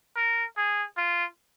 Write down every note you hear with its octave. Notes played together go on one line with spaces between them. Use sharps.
A#4
G#4
F4